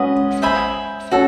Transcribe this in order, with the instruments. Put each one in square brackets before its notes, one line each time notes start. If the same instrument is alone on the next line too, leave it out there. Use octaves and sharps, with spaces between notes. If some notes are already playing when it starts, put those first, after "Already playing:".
Already playing: [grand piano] G#3 C#4 [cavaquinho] F#4 B4 D#5
[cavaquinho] C5 E5 G#5 B5
[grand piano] C#4 [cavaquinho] F#4 A4